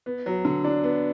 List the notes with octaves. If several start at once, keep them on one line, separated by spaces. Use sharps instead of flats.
B3
F#3
D3
D4
B3